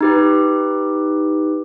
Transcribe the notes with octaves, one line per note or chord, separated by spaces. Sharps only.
D#4 G4 B4